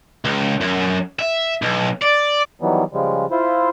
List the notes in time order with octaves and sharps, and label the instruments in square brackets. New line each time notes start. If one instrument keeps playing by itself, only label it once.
[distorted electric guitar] C#2
F#2
E5
B1
D5
[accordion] D#3 E3 F#3 G3 B3
C#3 F3 G3 G#3
E4 F4 C5